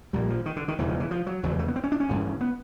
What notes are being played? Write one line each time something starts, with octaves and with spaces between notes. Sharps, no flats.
A#1 A#2 G3
F3
D#3
D3
D#3
E1 E2 C#3 E3
F3
E3
F3
F#3
F1 E2 C#3 F#3
G3
A3
B3
C4
C#4
D4
C#4
A1 G2 D3
B3